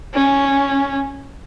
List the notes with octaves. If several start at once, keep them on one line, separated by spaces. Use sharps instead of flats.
C#4